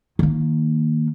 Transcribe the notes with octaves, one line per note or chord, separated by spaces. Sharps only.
D#3 A#3